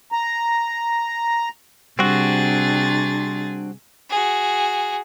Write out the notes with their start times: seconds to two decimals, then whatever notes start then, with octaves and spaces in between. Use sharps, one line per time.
0.12 A#5
1.99 C3 G3 C4 D4 F#4 G#4 A6
4.10 F#4 G#4